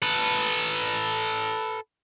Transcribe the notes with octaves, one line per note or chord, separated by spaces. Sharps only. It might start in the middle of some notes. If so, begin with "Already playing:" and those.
A4 B4